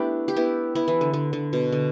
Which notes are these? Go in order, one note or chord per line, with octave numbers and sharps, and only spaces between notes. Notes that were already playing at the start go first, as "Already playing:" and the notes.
Already playing: A3 B3 D4 E4 G4
G4
B3 E4
B3 E4
E3
D3
D3
D3
B2
D3